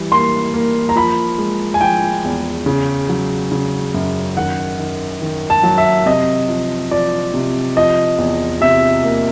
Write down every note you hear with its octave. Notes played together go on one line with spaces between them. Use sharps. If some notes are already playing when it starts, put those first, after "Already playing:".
Already playing: E3 G3
A#3 C6
A#3
A#5
F3 B5
G#3
G#5
F3 G5
E2
C#3
F#3
C#3
F#2
D#3 F#5
D#3
D#3
A5
F#3
E5
C3 D#5
F3
F3 D5
C3
F3 D#5
E2
C3 E5
A#3